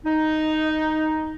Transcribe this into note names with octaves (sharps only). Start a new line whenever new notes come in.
D#4